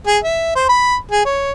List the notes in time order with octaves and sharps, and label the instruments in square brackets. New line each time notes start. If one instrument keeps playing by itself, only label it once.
[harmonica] G#4
E5
C5
B5
G#4
C#5